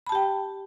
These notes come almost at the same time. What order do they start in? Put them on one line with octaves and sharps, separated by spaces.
B5 A5 G4 G5